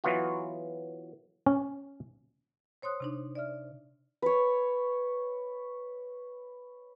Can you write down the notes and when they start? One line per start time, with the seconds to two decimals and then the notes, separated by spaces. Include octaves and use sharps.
0.04 E3 F#3 B3 F4 F#4
1.46 C#4
2.82 C5 C#5 C6 D#6 F#6
3.00 C3 D4 D#4
3.35 D5 E5 F6
4.22 B4 C#5